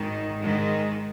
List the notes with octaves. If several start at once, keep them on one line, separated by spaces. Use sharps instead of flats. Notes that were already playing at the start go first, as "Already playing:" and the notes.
Already playing: G#1 G#2 D#3
G#2 D#3 G#3